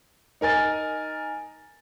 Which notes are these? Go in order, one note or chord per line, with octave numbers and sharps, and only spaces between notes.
D#4 A#4 G#5 A6